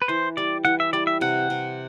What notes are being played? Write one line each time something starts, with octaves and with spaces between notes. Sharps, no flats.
B4
E3 C5
G3 D5
E3 F#5
E5
G3 D5
E5
C3 F#5
C3